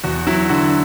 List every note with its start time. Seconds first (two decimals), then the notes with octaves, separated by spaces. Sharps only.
0.04 E2 F#4
0.27 F#3 E4
0.49 D3 F#4